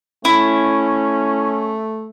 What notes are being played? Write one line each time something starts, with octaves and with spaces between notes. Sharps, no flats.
A3 C#4 E4